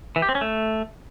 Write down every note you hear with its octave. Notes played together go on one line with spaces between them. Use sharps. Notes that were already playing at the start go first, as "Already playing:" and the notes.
E3
G4
C4
C#4
A3